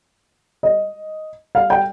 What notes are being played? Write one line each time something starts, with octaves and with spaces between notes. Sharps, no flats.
D#5
F5
G5